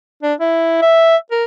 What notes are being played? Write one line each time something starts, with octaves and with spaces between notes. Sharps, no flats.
D4
E4
E5
A#4